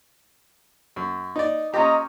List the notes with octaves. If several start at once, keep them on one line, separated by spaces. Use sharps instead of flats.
F#2
D#4 D5
C#4 F4 G4 D#5 A#5